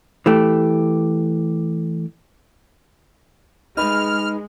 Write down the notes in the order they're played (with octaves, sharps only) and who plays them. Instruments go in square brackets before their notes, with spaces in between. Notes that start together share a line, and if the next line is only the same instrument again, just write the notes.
[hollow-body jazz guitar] E3 A3 G4
[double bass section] G#3 [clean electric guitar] D#4 B4 [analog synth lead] F6